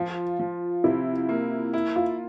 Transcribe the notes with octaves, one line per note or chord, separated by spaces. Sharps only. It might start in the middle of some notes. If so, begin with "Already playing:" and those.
Already playing: F3 F4
F3
C3 E4
A#3
E4
F4